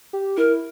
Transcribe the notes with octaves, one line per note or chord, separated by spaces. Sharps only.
G4
E4 A#4